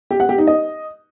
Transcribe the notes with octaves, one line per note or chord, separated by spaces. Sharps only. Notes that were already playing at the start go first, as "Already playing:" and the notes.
G4
F#5
G4
D#4
D#5